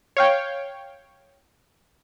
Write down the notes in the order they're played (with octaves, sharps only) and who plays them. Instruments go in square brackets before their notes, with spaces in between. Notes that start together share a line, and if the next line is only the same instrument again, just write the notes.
[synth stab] C#5 F5 G5